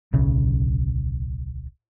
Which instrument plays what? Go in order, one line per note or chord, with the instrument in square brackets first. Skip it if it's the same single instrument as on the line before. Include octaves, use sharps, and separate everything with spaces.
[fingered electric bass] D1 B1 C#3